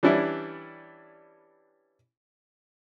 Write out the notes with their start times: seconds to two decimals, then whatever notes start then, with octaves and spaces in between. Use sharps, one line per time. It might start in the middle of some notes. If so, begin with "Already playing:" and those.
0.03 E3 G3 C#4 D4 E4